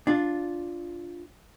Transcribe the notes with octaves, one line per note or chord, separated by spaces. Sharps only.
D4 F4